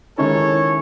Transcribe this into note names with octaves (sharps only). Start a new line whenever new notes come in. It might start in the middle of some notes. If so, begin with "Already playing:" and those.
D#3 G#3 C#4 E4 A4 C#5